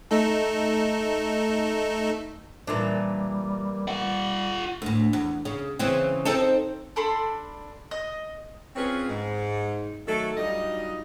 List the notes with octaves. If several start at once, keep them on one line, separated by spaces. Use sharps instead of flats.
A3 D#4 A4
A#2 E3 G3 D4
G3 F4 F#5
D2 A2
E2
C#3
C#3 E3 C4
C4 D#4 A4
D4 A4 B5 C6
D#5
C4 C#4 F4 G#4 B4 C#5
G#2
D#3 F#3 A3 A4
F#3 G3 D4 D#4 F4 D#5